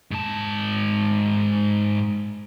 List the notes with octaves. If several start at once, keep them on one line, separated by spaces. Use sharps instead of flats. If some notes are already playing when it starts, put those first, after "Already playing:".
G#2 A5